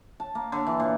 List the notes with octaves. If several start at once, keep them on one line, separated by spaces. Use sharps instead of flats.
A5
A#3
D3
E3
A#2